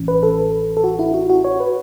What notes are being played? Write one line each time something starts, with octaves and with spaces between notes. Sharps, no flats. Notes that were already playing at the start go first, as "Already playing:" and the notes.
Already playing: A1 A2 E3 C#4
B4
A4
A4
F#4
E4
F#4
F#4
C#5
B4